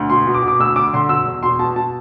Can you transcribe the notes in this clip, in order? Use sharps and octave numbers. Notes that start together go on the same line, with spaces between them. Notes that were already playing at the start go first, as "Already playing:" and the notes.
Already playing: D2
B2 C6
B2
D6
B2
D6
D2 E6
D2 D6
D3 C6
B2 E6
E2
B2 C6
B2 A5
B2 A5